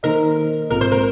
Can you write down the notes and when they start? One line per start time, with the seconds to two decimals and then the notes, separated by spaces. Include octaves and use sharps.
0.03 D#3 A#3 D#4 A#4 C5 D#5
0.71 A#1 G#2 G#3 C4 F4 A#4
0.81 C5
0.92 A#4